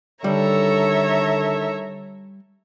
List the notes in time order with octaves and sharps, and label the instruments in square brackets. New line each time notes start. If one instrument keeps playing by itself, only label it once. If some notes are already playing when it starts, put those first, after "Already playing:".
[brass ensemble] D3 D#3 A4 [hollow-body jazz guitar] G3 [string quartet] C#5 E5 A#5